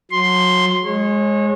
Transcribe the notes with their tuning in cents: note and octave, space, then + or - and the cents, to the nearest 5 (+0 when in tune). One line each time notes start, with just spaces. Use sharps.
F#3 -25 C6 +0
G#3 +0 C#5 -30